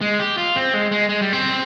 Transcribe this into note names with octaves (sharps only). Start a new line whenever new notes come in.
G#3
G4
F4
C4
G#3
G#3
G#3
G3
C4